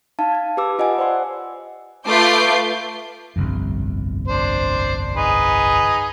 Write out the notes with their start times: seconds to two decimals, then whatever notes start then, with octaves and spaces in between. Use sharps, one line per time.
0.19 D#4 F5 A5
0.32 A5 G#6
0.57 G4 B4 D6 E6
0.79 F4 D#5 F#5 G#5
0.98 C5 D5 F#5 C6 E6
2.07 A3 F4 B4 D6 G6 C7
3.36 G1 C2 F2
4.28 D4 C5
5.16 D#4 G#4 B4